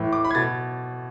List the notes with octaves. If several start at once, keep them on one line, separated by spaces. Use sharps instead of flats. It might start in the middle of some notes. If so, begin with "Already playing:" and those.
Already playing: A2 E3
D6
B5
G#6
B2 A6